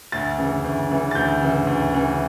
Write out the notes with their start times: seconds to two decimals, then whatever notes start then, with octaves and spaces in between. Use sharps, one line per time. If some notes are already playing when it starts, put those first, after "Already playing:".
0.12 D2 A6
0.38 C#3 E3
0.64 D2
0.89 C#3 E3
1.11 A6
1.15 D2 G6
1.42 C#3 E3
1.67 D2
1.93 C#3 E3